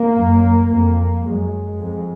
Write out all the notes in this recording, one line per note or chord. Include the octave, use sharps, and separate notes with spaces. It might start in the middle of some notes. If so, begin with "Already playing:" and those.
Already playing: A#3
F#2
F2 A#3
F#2 G#3
F2